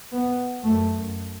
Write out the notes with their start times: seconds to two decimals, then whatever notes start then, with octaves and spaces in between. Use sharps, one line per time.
0.13 B3
0.63 F#2 A3